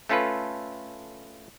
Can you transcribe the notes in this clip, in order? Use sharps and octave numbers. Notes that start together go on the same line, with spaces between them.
A3 C#4 F4 A4 B4